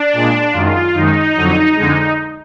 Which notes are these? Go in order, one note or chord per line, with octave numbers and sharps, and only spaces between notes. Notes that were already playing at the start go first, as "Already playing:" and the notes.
Already playing: D4
A#2 G#3
F#2 D#3 G#3 F4
F#2 D#3 G#3 D#4
F2 D3 F#3
F2 D3 G#3